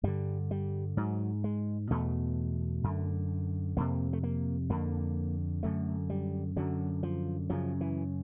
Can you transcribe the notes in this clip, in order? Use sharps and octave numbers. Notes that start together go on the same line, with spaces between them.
G2 D3 G3
G3
G#2 F#3
G#3
E2 B2 A3
F#2 D3
F2 C3 A#3
A3
A#3
F2 D3 A#3
F#2 D3 A3
G3
F#2 D3 F#3
F3
F#2 C#3 F3
E3